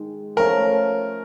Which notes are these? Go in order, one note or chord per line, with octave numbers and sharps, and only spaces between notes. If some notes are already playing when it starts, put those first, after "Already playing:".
Already playing: G#2 D#3 G#3
F3 A3 C#4 F4 A#4